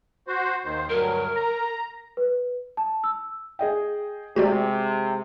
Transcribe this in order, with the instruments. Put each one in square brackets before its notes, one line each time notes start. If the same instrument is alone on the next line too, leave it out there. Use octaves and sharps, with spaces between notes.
[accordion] F#4 C5
D#2 D#3 C5
[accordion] D2 G2 F#3 [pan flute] A#4
[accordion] A#5
[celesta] B4
A5
E6
[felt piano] G#4 D#5 G5
[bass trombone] C3 [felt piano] G#3 [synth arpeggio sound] F#4 G4 D5